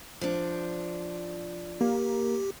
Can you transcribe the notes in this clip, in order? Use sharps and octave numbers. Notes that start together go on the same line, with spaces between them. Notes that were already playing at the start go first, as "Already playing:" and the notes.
F3 D4
A#3 G4